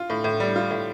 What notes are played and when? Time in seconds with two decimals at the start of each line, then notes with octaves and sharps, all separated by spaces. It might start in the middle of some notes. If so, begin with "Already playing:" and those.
Already playing: F4
0.10 A2
0.24 A2
0.40 G3
0.56 F4
0.71 A2